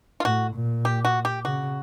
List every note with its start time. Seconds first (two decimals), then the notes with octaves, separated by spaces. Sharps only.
0.20 F4
0.24 A2 F#4
0.54 A#2
0.85 G4
1.05 F#4
1.25 G4
1.45 C#3 F#4